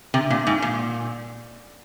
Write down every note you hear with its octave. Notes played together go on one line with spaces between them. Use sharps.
C3
A#2
G#2
A#2